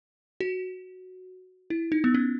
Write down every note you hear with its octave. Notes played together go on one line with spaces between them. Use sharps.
F#4
E4
D#4
B3
C#4